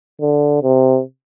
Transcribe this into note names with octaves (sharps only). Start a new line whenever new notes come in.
D3
C3